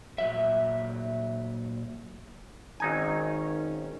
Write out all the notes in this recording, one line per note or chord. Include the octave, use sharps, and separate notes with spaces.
A#2 F#3 E5
G#1 D#3 C#4 D#4 G#5